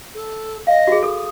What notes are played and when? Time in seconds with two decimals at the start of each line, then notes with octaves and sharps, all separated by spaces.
0.15 A4
0.67 D#5 F5
0.87 F#4 G#4
1.03 A4 D#6